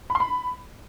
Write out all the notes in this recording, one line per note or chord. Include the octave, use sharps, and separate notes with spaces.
B5
C6
B5